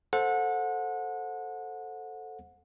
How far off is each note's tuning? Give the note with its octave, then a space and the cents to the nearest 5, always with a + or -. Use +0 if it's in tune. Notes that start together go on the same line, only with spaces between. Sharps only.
A4 +0 C5 +5 F#5 -25